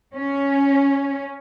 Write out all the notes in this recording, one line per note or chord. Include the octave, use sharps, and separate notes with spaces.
C#4